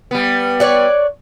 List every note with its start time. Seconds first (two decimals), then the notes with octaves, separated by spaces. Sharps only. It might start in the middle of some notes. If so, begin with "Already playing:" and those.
0.11 G3 B3
0.60 C#5 D5 F#5